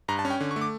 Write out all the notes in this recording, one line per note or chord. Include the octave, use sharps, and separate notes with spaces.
G2 A#5
A5
C#4
G5
D3
C#6
A3
D6